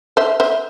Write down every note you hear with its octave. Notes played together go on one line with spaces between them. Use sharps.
C5 E5
C5 E5